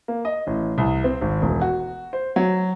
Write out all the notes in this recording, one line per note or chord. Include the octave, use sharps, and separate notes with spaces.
A#3
D#5
A1
C2
C4
G#1
E1
F#4
C5
F#3